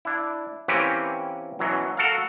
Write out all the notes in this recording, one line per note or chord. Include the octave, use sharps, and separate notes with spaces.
D4 E4
E3 A#3 C4 C#4 G4 B4
F#2 B2 E3 F#3
F#4 A4 A#4 F5